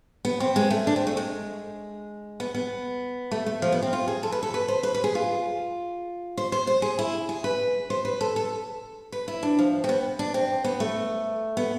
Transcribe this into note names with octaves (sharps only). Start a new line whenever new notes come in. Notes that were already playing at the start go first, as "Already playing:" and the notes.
B3
C4
G#3
A3
D4
C4
A3
G#3
B3
B3
A3
A3
F3
B3
C4
F4
G#4
A4
B4
A4
B4
C5
B4
B4
G#4
F4
C5
C5
C5
G#4
E4
G#4
B4
C5
B4
A4
A4
B4
E4
D4
F3
C4
B3
D4
C4
B3
A3
B3